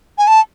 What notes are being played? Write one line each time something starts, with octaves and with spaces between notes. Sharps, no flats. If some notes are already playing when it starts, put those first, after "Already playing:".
G#5
A5